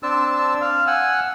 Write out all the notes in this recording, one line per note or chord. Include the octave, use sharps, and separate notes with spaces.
C4 D4 A5 E6
F5
F#5 G#5 E6